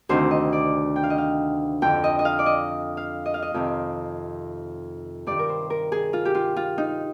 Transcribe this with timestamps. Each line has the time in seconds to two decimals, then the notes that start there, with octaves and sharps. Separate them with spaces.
0.09 D2 C3 D#3 C5
0.31 D#5
0.53 D5
0.96 G5
1.03 F5
1.10 D#5
1.18 F5
1.82 F2 D3 G5
2.04 D#5
2.19 D#5
2.25 F5
2.39 D5
2.46 D#5
2.97 F5
3.26 D#5
3.34 F5
3.42 D#5
3.54 F2 C3 D#3
5.27 G2 D#3 D5
5.39 A#4
5.49 C5
5.70 A#4
5.92 G#4
6.13 F4
6.25 G4
6.35 F4
6.57 F4
6.78 D#4